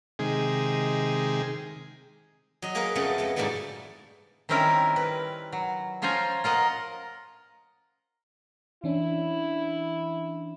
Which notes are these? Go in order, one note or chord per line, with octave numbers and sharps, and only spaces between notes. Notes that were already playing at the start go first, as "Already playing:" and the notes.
C3 D#3 G#3 G#4
F#3 D#5
A#3 G#4 A#4 B4 C#5
F2 C#3 A3 B3 C#5
G#3 A3 B3
G#2 B2 D3 G3 A3 E4
D#3 G3 C4 C#4 E4 A#4
B4
F#3
F3 C#4 F4 C5 G#5 A#5
F4 A#4 D#5 F#5
E3 C#4 D4 E4